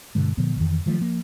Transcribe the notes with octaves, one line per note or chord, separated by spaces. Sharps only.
G2 B2 D3 G#3
A#2 D3 F3 B3
F2 A2 D#3 E3
D#3 F3 F#3 A3
F3 A#3